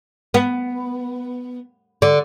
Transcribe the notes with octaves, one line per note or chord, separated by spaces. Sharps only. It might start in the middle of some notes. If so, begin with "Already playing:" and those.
B3
D3